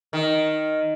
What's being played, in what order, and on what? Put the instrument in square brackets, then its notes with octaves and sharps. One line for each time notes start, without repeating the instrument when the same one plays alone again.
[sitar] D#3